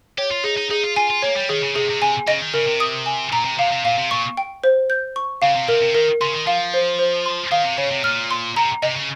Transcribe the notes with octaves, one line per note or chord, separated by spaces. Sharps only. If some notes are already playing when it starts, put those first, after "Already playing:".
G4 C#5
F4
D#4 G#4
D#4
D#4 G#4
F4
F4 G#5
F4
A#3 C#5
G3
D#3 G#4
C#3
C3 G#4
C3
C3 G#5
C#3 D#5
D#3
C#3 A#4
C3
D#6
G#5
A#2 A#5
C3
C3 F5
C3
A#2 F5
C3
A#2 C#6
G5
C5
G6
C#6
C#3 F5
C3
C3 A#4
C3
D#3 A#4
C#3 C6
D#3
F3 F5
C5
C5
C6
D#3 F5
C3
C#3 C#5
C3
A#2 F6
C6
C3 A#5
C3 D#5
C#3